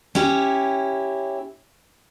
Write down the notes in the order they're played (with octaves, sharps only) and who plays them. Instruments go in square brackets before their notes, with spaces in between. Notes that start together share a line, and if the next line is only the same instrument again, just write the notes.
[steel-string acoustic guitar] C#4 E4 G4